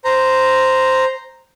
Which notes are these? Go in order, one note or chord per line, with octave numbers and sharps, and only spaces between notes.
C5 A#5